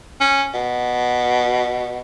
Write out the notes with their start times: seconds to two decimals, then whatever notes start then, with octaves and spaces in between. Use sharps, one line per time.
0.21 C#4
0.54 B2